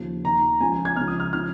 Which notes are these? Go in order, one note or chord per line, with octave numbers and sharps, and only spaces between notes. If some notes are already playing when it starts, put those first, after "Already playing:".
Already playing: D#2 C#3 F3
D#2 D#3 A#5
C#2 C#3 F3 G#5
G#5
G#6
C#2 C#3 F3 F6
D#6
F6
C#3 F3 F6